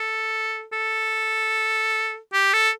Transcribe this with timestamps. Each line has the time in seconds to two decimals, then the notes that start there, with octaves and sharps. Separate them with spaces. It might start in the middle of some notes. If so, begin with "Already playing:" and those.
Already playing: A4
0.73 A4
2.33 G4
2.53 A4